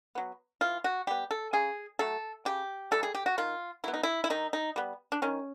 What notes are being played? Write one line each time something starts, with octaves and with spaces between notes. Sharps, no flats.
F#3 B3
E3 F4
F#4
G3 B3 G4
A4
C#3 G#4
F#3 A3 A4
C#3 G4
E3 G3 A4
G#4
G4
F#4
D#3 F4
F#3 B3 E4
D#4
E4
E4
D#3 D#4
D#4
G3 B3
D4
D#3 C#4